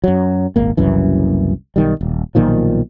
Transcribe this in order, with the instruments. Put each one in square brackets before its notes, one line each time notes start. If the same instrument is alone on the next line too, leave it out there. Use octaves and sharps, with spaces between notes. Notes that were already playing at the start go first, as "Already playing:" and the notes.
[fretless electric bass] F#2 F#3
D#1 G#1 A#3
F#1 C2 F#2 E3
B1 D#3 G3
D#1
B1 A#2 D#3 F3